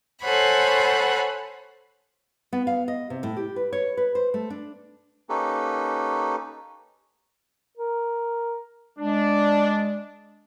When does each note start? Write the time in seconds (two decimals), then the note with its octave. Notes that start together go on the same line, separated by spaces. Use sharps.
0.22 A4 C5 C#5 F#5 G#5 B5
2.53 B3
2.67 F5
2.88 D#5
3.10 C3
3.23 A2
3.37 G4
3.56 B4
3.73 C#5
3.97 B4
4.15 C5
4.34 A3
4.50 D4
5.29 A#3 C#4 D#4 G4 A4 B4
7.78 A#4
8.99 G#3 D4